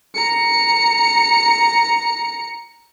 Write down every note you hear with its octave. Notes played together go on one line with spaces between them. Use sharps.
A#5 C#7